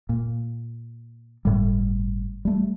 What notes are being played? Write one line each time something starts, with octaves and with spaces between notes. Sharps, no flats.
A#2
G1 A2 G3
G3 A3